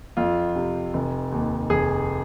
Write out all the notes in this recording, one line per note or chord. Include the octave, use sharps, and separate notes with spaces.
F2 F4
C3
F1
D#2
F1 G#4